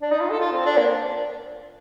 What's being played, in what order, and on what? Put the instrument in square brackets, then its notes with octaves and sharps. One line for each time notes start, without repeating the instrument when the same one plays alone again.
[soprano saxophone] D4
D#4
F4
A4
F4
C4
D4
A#3